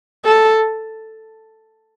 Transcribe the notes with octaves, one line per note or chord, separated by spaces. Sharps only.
A4